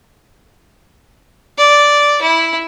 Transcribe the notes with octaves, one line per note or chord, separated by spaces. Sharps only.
D5
E4